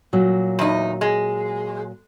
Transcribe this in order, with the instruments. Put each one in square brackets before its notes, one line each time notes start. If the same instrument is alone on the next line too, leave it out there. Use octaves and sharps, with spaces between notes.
[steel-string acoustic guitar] A#2 F#3
[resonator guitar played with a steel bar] E2 D#4
G#3